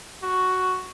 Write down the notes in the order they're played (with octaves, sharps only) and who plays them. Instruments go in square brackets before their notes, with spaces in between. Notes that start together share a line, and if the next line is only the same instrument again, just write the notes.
[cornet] F#4